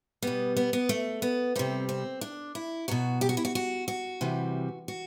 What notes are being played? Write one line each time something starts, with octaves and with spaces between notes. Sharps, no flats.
B2 G3 B3
B3
B3
A3
B3
C3 G3 C4
C4
D4
E4
B2 F#3 F#4
G4
F#4
E4
F#4
F#4
F#4
C3 E3 G3
F#4